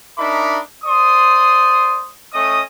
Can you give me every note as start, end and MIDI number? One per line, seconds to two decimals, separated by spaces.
0.18 0.60 62
0.18 0.60 63
0.18 0.60 70
0.18 0.60 76
0.18 0.60 83
0.18 0.60 86
0.84 2.09 72
0.84 2.09 74
0.84 2.09 84
0.84 2.09 87
2.33 2.61 57
2.33 2.61 61
2.33 2.61 75
2.33 2.61 87